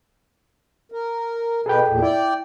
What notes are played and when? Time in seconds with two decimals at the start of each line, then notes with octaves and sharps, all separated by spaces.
0.92 A#4
1.66 B2 G#4 A4 B4 G5
1.88 E2 A#2
2.02 E4 D5 G5